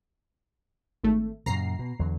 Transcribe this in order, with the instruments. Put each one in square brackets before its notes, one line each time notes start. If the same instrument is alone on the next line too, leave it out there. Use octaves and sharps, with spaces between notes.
[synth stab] G#1 A3
[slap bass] F#2 A#2 C#3 [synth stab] A#5 C7
[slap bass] B2
E2 D3 F#3